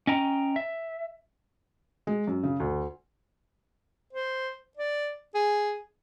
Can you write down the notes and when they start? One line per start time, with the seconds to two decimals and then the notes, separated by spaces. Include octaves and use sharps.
0.07 C#4 D#5 G5 A#5
0.56 E5
2.07 G#3
2.27 F#2
2.43 C#3
2.60 D2
4.13 C5
4.77 D5
5.35 G#4